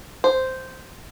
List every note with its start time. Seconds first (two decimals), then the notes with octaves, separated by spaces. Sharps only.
0.24 C5